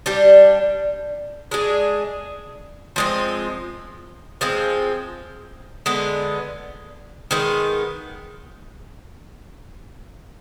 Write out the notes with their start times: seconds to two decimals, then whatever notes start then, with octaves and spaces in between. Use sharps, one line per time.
0.06 G3 D4 G4
1.51 G#3 D4 G#4
2.96 F3 G#3 C4
4.41 F3 G#3 C4
5.86 D3 G#3 B3
7.31 D#3 G#3 B3